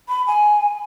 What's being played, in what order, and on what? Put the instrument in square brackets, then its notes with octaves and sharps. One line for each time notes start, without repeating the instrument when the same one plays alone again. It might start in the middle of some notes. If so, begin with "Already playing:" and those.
[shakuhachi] B5
G#5